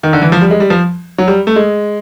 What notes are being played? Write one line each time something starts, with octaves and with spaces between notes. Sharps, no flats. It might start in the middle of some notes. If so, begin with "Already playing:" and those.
D#3
D3
E3
F3
G3
G#3
G3
F3
F#3
G3
A3
G#3